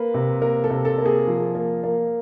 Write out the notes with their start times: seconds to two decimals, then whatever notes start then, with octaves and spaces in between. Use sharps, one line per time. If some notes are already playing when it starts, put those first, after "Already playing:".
Already playing: A#3 B4
0.14 C3
0.42 A#3 A#4
0.64 A4
0.70 C3
0.85 A4
0.98 A#3
1.06 G#4
1.27 F3
1.55 A#3
1.83 A#3